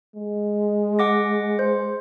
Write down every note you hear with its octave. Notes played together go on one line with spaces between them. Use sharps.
G#3
F#5 D6 A#6
C5